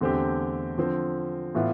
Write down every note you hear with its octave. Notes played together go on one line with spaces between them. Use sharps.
E2 D3 A3 C4 G4
D3 F3 C4
A2 E3 B3 F4